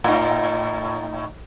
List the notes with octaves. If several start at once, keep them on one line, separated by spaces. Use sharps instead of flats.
A2 D#4